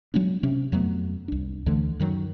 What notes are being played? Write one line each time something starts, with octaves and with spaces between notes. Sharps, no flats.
F#3 G#3 B3 D4
C3 C#4
F2 F#3 A3 B3
C2 D4
D2 D3 E3 A3
F#2 D#3 F#3